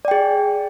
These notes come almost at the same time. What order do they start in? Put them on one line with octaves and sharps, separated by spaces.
D5 G5 G#4